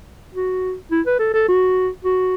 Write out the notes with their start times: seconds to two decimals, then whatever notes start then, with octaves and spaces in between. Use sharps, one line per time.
0.35 F#4
0.92 E4
1.06 B4
1.19 A4
1.34 A4
1.49 F#4
2.05 F#4